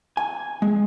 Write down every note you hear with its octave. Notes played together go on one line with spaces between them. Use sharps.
G#5
G#3